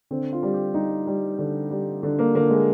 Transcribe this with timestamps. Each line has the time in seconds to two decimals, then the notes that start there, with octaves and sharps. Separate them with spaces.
0.11 D3 C4
0.33 F4
0.43 G3
0.54 G4
0.74 G3 D#4
1.07 G3
1.39 D3
1.71 G3
2.03 D3
2.19 A#3
2.35 D3 A#3
2.50 G#3